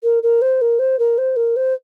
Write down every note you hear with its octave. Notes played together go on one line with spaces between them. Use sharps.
A#4
A#4
C5
A#4
C5
A#4
C5
A#4
C5